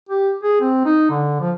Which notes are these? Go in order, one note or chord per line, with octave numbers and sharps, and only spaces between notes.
G4
G#4
C4
D#4
D3
F3